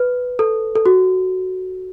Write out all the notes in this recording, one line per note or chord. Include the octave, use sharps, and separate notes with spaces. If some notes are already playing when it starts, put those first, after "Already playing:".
Already playing: B4
A4
A4
F#4